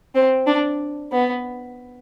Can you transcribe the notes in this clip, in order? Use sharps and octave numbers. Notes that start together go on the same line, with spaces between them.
C4
D4
B3